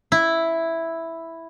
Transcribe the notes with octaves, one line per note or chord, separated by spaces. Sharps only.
E4